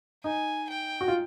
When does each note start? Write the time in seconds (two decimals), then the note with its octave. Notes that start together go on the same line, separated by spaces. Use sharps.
0.24 D#4 G#5
0.70 G5
1.01 F#4
1.08 F4